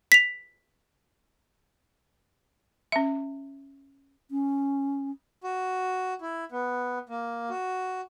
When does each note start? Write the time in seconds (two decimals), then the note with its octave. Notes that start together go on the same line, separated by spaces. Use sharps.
0.12 B6 F7
2.92 C#4 E5
4.31 C#4
5.44 F#4
6.21 E4
6.52 B3
7.09 A#3
7.50 F#4